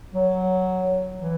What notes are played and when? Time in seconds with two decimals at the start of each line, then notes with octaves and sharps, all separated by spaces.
0.14 F#3
1.20 E3